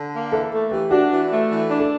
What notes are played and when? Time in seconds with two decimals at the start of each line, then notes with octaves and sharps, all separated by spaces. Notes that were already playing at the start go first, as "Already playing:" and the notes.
Already playing: D3
0.13 A#3
0.32 E3 A4
0.52 A3
0.71 E3 G4
0.91 D4 F#4
1.11 E3
1.30 A3
1.49 E3
1.69 D4
1.79 A4